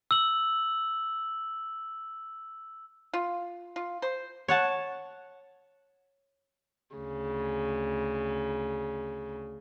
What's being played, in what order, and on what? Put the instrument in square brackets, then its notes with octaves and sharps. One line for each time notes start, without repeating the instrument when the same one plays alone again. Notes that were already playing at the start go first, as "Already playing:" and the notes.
[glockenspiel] E6 F#7
[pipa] F4
F4
C5
[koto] C#5 F#5 A5
[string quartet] D2 C#3